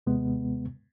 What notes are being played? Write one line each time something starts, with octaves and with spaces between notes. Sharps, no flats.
D#2 C3 G#3 B3